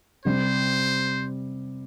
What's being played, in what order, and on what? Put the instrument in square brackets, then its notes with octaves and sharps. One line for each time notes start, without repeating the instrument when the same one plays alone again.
[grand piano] C3 G3 C4 [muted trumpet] C5